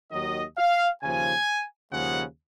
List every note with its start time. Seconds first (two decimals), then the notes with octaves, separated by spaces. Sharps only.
0.11 D#2 D#3 F#3 D#5
0.57 F5
1.02 D#2 C#3 F3 G#5
1.91 D#2 C#3 F3 G#3 F#5